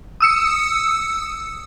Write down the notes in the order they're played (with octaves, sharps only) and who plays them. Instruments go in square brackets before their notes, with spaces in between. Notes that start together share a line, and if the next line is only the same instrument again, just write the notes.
[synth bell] D#6 E6 C#7